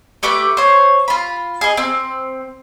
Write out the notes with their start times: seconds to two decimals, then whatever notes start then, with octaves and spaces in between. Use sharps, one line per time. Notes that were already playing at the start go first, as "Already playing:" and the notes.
0.23 A3 G4 B4 D6
0.57 C5 C#5
1.08 F4 B5
1.61 G#4 D#5
1.77 C4